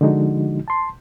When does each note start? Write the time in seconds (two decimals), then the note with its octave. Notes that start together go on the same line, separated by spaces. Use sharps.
0.01 D3 F3 G#3 D#4 F#4
0.68 A5 C6